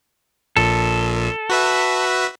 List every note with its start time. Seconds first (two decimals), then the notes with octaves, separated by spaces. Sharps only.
0.56 A#1 A#2 A4
1.49 F#4 B4 E5